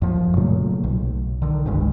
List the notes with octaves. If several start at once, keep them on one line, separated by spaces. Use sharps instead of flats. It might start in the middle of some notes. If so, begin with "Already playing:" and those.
F#2 F3
A#2 C#3 F#3 A3
B1
D3 D#3
F#1 C#2 G2 G#3